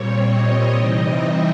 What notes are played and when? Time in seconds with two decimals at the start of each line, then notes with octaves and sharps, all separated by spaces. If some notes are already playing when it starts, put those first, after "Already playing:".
Already playing: A#2 G3 C4 C#5
0.25 D#5
0.73 C3 E3 G3 C4 D#4
1.22 E5